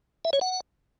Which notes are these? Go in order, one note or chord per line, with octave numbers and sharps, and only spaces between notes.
E5
C#5
F#5